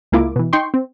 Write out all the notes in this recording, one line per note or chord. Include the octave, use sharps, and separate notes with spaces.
C#2 G#3 A#3 E4 F4 D6
B2 E3
D#4 G5 C6 C#6
C4